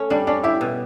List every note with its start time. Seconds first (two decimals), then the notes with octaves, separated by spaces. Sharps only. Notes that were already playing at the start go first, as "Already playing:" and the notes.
Already playing: A3 C#4
0.10 G3 D4
0.27 C#4 D4
0.43 E4 G4
0.61 B2